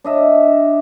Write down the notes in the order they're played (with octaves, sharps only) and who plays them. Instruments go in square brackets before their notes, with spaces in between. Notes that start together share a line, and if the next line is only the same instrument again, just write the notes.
[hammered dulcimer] D4 D#5 E5